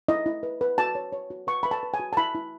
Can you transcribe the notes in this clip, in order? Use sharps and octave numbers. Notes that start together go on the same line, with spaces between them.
E4 D#5
E4
B4
B4
F#4 A5
C#5
C#5
F#4
B4 C#6
B4 B5
A5
B4
G#5
F#4
A5
E4 B5
E4